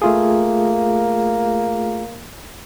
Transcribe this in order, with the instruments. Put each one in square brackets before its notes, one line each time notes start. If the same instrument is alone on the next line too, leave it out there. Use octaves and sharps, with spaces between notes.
[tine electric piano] A3 F4 G#4 [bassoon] A#3